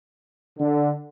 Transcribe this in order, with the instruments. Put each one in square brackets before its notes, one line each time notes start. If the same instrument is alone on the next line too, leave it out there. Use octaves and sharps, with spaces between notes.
[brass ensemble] D3